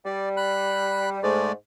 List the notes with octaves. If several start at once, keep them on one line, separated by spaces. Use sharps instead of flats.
G3 D5
B5 F#6
G#2 G#3 A3 D5